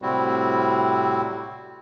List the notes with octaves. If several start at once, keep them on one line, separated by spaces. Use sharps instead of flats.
A2 C3 G3 C4 E4 F#4